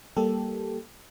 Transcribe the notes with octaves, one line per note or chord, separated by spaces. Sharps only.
G3 A#3 G4 A4